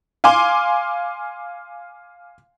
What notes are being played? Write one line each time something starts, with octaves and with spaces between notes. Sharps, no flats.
F5 G#5 C6 D6